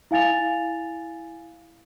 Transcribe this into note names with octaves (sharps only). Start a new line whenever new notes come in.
E4 F5 G#5 A6 F7